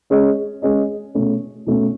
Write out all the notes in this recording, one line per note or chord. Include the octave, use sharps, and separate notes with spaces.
G#3 C#4 G#4 D#5
G#3 C#4 G#4 D#5
B2 A3 C#4
B2 A3 C#4